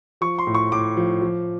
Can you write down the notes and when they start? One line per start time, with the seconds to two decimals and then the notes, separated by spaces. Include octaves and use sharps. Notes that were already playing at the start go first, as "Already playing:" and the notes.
0.21 F3 C#6
0.38 C6
0.47 A2
0.55 C#6
0.72 A2 D6
0.97 F3
1.22 F3